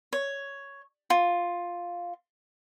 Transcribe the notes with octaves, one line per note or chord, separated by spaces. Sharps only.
C#5
F4